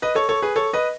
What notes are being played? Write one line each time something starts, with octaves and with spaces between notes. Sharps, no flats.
B4 D#5
A4 C#5
A4 C#5
G#4 B4
A4 C#5
B4 D#5